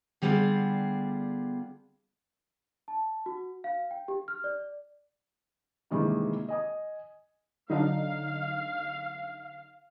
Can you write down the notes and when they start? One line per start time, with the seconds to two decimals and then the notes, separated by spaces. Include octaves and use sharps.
0.22 D3 G3 B3 F4 G#4 D5
2.88 A5
3.26 F#4
3.64 F5
3.91 G5
4.08 G4
4.28 F6
4.44 D5
5.91 G2 C3 D#3 E3 G#3 A#3
6.48 D#5 G#5 D#6
7.70 D3 F#3 D#4 F5